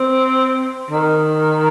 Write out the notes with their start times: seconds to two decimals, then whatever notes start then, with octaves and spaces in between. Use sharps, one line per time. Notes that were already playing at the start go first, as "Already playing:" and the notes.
Already playing: C4
0.90 D#3